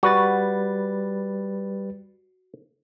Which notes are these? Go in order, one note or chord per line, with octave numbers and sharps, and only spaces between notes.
G3 F#4 B4 A6